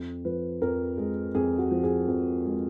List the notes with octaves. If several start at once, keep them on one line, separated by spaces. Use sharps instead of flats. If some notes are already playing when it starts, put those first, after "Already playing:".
Already playing: F2
F3 B4
F2 A#4
G#3
F2 G#4
F#4
F3
G#4
F2
G#3